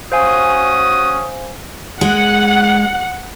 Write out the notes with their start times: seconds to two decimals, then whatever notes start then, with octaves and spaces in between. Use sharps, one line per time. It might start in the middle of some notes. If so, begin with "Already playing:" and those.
0.12 C#4 F#4 C5 F5 G#5 D#6
2.01 G#3 F#5